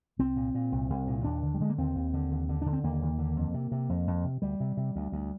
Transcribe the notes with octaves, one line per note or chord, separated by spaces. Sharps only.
C2 C4
A#2
A#2
C2
C2
A#2
D#2 D4
D3
G3
D3 G#3
A#3
D#2 C4
D#2
D3
D#2
D3
D3 D4
C4
D#2 A#3
D#2
D3
F2
C3
C3
F2
F2
C3
D2 G3
C3
C3
D2
D2